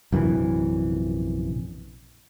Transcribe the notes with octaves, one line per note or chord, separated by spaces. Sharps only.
A#1 F#2 C3 E3